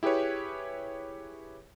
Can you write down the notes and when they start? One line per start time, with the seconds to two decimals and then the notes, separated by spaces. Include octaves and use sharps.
0.03 E4 G4 G#4 B4 C#5